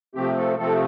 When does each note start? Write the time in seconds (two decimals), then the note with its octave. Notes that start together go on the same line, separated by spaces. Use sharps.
0.15 C3 F3 A3 C4 G4
0.38 A4
0.59 C3 F3 A3 C4 A4